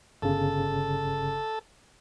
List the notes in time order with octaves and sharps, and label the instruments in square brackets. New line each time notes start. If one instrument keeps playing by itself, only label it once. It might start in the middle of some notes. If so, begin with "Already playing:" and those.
[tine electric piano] G1 C#3 [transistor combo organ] A4